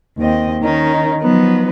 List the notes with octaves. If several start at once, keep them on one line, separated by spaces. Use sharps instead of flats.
D#2 C4 D#5
D#3 C#4 D#4 A#4
F3 F#3 B3 D#4 B4